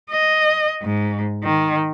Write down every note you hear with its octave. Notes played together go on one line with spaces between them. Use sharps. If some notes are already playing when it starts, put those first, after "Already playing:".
D#5
G#2
D#3